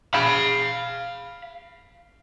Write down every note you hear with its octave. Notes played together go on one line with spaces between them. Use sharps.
F5 B5